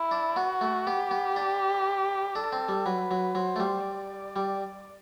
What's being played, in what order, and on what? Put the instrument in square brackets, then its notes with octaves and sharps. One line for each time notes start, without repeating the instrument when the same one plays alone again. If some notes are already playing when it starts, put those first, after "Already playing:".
Already playing: [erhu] E4
[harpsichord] D4
[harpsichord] B3 [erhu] F#4
[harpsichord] A3
[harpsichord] B3 [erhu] G4
[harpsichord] B3
D4
[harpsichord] D4 [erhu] A4
[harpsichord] C4
G3
[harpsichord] F#3 [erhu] B4
[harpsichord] F#3
[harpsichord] F#3 [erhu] C5
[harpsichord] A3
G3
[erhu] D5
[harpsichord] G3